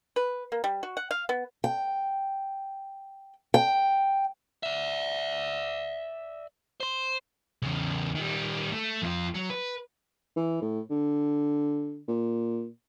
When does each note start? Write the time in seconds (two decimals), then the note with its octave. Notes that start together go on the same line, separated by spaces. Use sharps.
0.16 B4
0.52 A#3
0.64 G3
0.83 F#4
0.97 F#5
1.11 F5
1.29 B3
1.64 G5
3.54 G5
4.63 D5 E5
6.80 C5 C6
7.63 E2 C#3
8.15 D#3 G3
8.72 A3
9.02 F2 F4
9.34 F#3
9.50 B4
10.36 E3
10.62 A2
10.90 D3
12.08 A#2